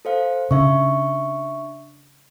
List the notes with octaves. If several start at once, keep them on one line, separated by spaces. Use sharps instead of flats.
A4 C5 F5
C#3 D4 E5 C#6